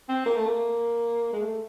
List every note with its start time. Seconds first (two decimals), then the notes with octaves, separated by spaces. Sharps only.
0.09 C4
0.26 A#3
0.36 A3
0.47 A#3
1.33 G#3
1.42 A3